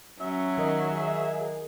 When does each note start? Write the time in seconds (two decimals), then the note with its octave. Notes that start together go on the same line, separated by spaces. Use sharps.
0.20 F#3 C#4 E5
0.58 D#3 A#4 D#5
0.87 G#4